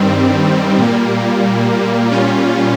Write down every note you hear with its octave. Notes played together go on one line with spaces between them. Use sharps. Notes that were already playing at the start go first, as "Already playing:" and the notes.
Already playing: G2 D#3 G3 C4
A#2 G3 A#3
A#2 G3 C#4 F4